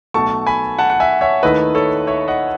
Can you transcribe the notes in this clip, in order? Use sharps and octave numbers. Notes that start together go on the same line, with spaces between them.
B1 B2 A3 A5 C#6
G#5 B5
F#5 A5
F#5
E5 G#5
C#5 E5
D#2 D#3 A3 E4 B4 D#5
A4 C#5
C#5 E5
D#5 F#5